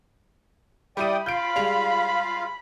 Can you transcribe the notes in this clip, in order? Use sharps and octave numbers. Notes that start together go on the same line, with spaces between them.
G3 E4 D5 G5 D#6 D#7
F4 F5 B5 G6 D7
G3 G#3 F7